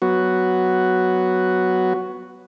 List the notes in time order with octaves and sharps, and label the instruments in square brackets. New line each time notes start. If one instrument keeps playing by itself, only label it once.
[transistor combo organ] F#3 B3 F#4